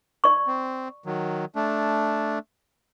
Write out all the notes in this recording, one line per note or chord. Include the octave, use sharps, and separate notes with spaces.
D5 C#6
C4
D#3 F#3
A3 D4